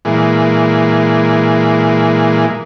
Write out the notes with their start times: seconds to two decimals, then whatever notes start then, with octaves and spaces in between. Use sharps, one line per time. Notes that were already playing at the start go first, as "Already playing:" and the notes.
0.05 A#2 E3 G#3